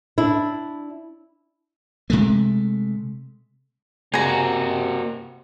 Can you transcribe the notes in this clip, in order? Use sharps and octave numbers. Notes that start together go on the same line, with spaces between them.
D4 E4
C3 G#3 A3
C3 A#3 F#4 G#4 A#5